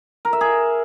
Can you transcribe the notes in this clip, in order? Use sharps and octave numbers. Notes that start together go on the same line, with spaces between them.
A#4
E5
G#4